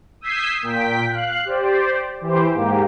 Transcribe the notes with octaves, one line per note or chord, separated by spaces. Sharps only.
D#6 E6 G6 G#6 B6 C7
A#2 G5 B6
F5 F#6
G4 C5 D5
E3 G4 C5
G#2 A#3 G4